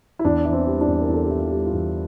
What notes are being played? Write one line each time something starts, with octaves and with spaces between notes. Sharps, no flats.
E4
E2 D4
E3
C4
G3
D4
E2
A#4
E2
A4
G4
E3
F4
G3
F4
E2